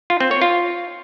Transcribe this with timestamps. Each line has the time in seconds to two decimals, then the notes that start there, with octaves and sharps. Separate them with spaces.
0.10 F4
0.21 C4
0.31 C#5
0.42 F4